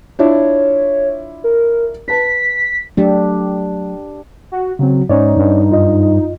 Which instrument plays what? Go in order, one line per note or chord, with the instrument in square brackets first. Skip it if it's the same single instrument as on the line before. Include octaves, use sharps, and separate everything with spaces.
[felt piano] D4 E4 F4 [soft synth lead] C#5
[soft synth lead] A#4
[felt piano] B4 A5 [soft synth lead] B6
[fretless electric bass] F#3 A3 [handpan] D4 G4
[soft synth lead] F#4
[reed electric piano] C#3 C4 [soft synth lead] F#3
[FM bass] G#2 [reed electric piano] C#4 C#5 D5 [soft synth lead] D#4
[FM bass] G2
[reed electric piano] F#2 F4 D#5